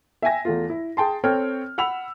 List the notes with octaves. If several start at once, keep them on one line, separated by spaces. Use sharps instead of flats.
E5 G5 G#5 A#6
E2 A3 F4
E4
G#4 G5 A5 C6
C4 A4 C#5 G5 F6
F#5 B5 E6 F7